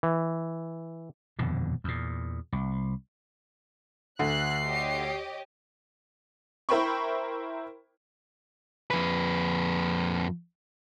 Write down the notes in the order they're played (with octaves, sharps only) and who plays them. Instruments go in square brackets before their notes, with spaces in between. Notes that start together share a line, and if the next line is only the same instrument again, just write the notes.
[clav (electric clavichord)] E3
[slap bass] D#1 F2 B2 D3
E2 A#2
C2
[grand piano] D2 [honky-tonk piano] D3 [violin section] F#6 [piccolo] C7
[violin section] G4 C#5 D#5
[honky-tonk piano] E4 A#4 C5 G5 B5 C#6
[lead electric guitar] F2 B4